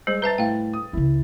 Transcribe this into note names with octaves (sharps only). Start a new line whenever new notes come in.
G3 G#3 C5
B4 E5 A5 A#5 A6
A2 F5 G5
D#6
C#2 C#4 E4